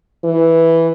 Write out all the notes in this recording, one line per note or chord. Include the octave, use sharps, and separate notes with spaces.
E3